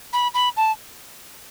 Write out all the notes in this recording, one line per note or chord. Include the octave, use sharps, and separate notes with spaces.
B5
B5
A5